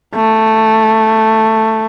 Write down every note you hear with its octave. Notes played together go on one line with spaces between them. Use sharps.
A3